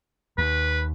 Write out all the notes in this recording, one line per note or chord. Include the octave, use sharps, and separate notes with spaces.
D#2 B4